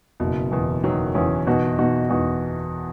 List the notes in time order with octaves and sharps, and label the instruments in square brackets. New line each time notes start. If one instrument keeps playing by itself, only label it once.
[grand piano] F#1 [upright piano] B2
[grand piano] E2 [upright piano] B2
[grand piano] E2 [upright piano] D#3 F#3
[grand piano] E2 [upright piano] C#4 E4
[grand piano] B2 [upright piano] D#4 F#4
[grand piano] B2 [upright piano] D#4 F#4
[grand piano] E2 [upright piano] D#4 F#4